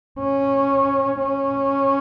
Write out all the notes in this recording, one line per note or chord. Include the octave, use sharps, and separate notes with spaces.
C#4
C#4